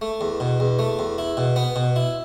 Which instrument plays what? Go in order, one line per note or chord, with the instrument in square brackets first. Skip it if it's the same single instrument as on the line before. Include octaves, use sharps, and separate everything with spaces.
[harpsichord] A3
E2
B2
E2
A3
E2
E4
B2
B3
B2
E4